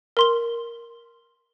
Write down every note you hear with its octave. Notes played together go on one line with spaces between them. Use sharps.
A#4 C6 G7